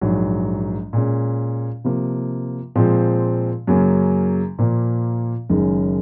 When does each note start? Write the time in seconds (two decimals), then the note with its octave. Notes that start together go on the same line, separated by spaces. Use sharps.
0.01 A#1 G#2 F#3
0.93 A#2 G#3 C#4
1.84 C3 F3 A#3
2.76 A#2 F3 G#3 C4
3.67 F#2 C#3 F#3 A#3
4.59 A#2 F3 A#3
5.49 F#1 F#2 D#3 G#3 C#4